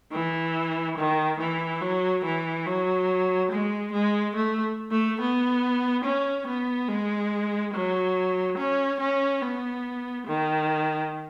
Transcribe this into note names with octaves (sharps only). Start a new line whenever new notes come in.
E3
D#3
E3
F#3
E3
F#3
G#3
G#3
A3
A3
B3
C#4
B3
G#3
F#3
C#4
C#4
B3
D#3